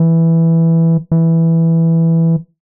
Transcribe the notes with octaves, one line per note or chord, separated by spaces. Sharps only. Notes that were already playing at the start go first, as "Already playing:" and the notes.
Already playing: E3
E3